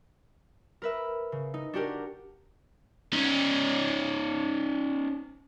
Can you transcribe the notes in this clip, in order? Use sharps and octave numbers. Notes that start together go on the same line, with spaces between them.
A#4 B4 E5
C#3
D#4
D4 F#4 G4 A#4
C#4 D#4